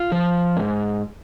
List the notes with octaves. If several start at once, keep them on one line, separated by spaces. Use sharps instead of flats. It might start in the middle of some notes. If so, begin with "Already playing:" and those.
Already playing: F4
F3
G#2